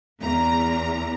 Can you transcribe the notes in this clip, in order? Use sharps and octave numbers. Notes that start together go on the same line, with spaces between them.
E2 A#5